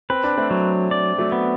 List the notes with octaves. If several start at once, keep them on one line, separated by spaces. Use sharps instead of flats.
C4 B4
D4
A3 C4
F#3
D5
F#3 A3
B3